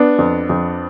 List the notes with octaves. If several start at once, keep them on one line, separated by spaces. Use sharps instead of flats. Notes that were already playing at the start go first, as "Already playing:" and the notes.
Already playing: B3 D4
F2
F2